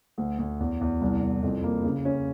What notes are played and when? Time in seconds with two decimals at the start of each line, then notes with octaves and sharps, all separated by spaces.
0.18 D2
0.38 D2
0.60 E2
0.81 E2
1.01 C2
1.22 C2
1.42 F2
1.63 A#3
1.83 C#3
2.05 C#4